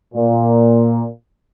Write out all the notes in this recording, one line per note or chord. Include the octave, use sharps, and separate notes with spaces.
A#2